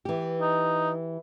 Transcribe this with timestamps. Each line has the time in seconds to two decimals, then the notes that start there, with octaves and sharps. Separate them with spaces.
0.05 E3 G4
0.40 D#4